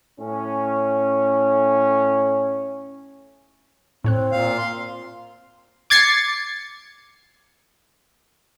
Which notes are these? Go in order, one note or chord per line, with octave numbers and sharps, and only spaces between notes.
A2 C#4
A2 C4 C#5 F#6
A#2 F5
C6
D6 G#6 A6 C7 C#7